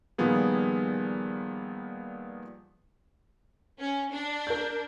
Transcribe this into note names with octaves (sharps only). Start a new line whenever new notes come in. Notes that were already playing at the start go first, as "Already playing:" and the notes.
A#2 D#3 F3 G3 B3 G#4
C#4
D4
A#4 G6